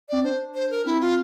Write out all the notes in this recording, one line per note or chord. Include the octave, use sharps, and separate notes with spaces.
C4 D5
D4 C5
C5
A#4
C4 E4
F4